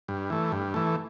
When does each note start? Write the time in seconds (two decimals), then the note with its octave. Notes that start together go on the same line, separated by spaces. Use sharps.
0.08 G2
0.30 E3 A3
0.52 G2
0.74 E3 A3